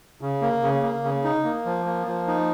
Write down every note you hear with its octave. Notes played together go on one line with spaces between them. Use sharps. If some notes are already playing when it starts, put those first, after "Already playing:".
C#3
A#3
C#3
A#3
C#3
D#4
A#3
F3
A#3
F3
D#4